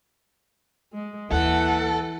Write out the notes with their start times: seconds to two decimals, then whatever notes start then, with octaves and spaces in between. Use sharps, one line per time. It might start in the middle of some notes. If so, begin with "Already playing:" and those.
0.93 G#3
1.31 D#2 E3 A4 F#5